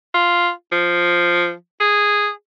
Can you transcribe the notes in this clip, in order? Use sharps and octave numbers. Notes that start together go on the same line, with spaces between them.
F4
F3
G#4